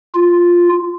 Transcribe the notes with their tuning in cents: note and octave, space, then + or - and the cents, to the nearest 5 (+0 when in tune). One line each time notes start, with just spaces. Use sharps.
F4 +0